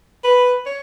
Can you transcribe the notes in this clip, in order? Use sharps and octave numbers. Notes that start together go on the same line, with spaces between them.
B4
C#5